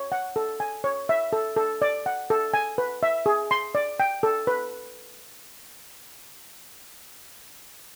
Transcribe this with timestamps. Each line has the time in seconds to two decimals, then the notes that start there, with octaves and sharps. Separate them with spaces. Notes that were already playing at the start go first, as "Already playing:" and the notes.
Already playing: C#5
0.12 F#5
0.36 A4
0.60 G#5
0.84 C#5
1.09 E5
1.33 A4
1.56 A4
1.82 D5
2.06 F#5
2.30 A4
2.54 G#5
2.78 B4
3.03 E5
3.26 G#4
3.51 C6
3.75 D5
4.00 G5
4.23 A4
4.47 B4